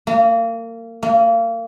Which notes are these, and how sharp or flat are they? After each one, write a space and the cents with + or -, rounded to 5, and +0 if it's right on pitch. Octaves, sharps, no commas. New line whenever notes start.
A#3 -30
A#3 -30